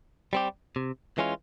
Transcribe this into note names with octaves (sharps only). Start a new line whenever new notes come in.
G3 C4 G4
C3
E3 G#3 C#4 F4